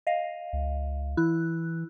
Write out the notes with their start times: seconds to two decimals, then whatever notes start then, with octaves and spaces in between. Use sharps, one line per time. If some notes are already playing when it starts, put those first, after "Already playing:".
0.07 D#5 F5
0.53 C#2
1.17 E3 E4 F#6